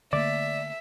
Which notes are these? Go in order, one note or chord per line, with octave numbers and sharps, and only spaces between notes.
D3 A3 A#3 D5 E5 A6